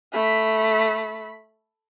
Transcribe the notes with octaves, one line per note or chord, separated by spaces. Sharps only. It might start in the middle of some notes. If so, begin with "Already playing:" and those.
A3 B5